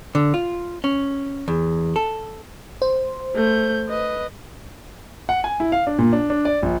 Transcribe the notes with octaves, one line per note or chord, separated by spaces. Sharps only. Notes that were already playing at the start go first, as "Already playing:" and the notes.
D3
F4
C#4
E2
A4
C5
A3 G6
B4 D#5
F#5
G#5
E4
F5
D4
A#2
D4
D4
D5
A#1